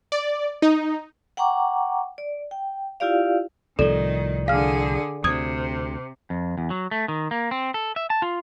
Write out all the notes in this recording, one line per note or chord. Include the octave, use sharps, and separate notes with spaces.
D5
D#4
F#5 G5 A#5 C#6 D6
D5
G5
E4 F4 G4 D5 F5
C2 A2 D#3 F3 A4 D5
D3 G#4 F5 F6
D2 C3 D#6 G#6
F2
E2
F#3
A3
D#3
A#3
C4
A4
E5
A5
F4